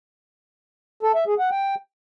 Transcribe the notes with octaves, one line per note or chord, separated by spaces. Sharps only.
A4
E5
G#4
F#5
G5